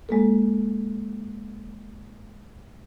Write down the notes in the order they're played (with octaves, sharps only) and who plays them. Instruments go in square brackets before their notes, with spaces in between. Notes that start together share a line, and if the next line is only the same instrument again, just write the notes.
[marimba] G#3 A#3 A4